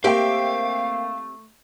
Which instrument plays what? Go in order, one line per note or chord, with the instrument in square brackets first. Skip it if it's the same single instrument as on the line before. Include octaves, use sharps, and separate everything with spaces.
[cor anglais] A3 [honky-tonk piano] A#3 E5 G5 [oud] C4 G4 [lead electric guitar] F5